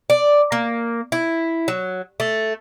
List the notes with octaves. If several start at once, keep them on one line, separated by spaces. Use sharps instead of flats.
D5
A#3
E4
F#3
A3